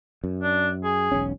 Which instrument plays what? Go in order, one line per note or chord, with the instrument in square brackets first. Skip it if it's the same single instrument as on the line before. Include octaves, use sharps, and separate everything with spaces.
[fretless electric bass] F#2
[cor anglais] D4
G#4
[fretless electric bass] E1 B1 C#4